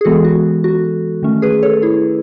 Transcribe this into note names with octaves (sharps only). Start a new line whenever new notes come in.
G#4
E3 G#3 B3 F#4 A4
F#4
F#4
D#3 A3 C#4
G#4 B4
A4 C#5
E4 G#4